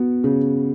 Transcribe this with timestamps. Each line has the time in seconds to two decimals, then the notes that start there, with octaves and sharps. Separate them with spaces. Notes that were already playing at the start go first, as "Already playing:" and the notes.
Already playing: B3 F#4
0.24 C#3